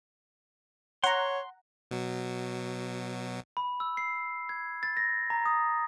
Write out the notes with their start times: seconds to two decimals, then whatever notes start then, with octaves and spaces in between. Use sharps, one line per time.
1.04 C#5 F#5 A#5 C6
1.91 B2 F#3
3.57 B5
3.80 E6
3.97 C7
4.49 G#6
4.83 A6
4.97 A#6
5.30 A#5
5.46 D#6